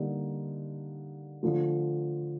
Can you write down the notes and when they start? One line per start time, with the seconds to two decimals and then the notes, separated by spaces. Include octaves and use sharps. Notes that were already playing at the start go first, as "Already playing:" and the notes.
Already playing: D3 G3 A#3 D#4
1.43 D3 F3 A3